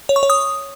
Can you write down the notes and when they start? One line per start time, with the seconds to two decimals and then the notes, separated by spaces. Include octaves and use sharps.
0.09 C#5
0.16 C#6
0.23 C#5
0.30 D#6